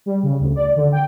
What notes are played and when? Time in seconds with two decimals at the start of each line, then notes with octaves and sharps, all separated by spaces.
0.06 G3
0.23 C#3
0.40 D2
0.56 D5
0.76 D3
0.92 G5